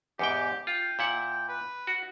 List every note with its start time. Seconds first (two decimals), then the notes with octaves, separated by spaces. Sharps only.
0.19 E2 G#2 G4 G5
0.67 F4 G5
0.99 A#2 E4 F#5
1.49 B4
1.87 F#4